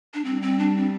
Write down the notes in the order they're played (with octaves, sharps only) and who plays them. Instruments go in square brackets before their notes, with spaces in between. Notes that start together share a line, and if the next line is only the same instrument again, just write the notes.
[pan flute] D4
[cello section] G3 [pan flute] C4
[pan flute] C4
D4
C4